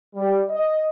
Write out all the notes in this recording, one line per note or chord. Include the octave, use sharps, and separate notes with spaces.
G3
D#5